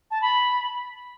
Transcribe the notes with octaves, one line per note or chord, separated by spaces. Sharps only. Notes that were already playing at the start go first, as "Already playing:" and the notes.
A5
B5